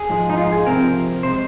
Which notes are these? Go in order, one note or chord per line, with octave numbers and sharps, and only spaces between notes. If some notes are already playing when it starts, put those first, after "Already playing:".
Already playing: G#4
G#2 F3 G#3
D#4
F4
G#4
C3 F3 C4 A#4
C3 G#3 C5